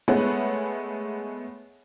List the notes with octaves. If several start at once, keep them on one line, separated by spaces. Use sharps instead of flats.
G#3 A3 B3 B4 C#5 F#5